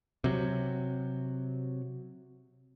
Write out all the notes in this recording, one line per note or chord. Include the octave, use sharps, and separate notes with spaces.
C3 F#3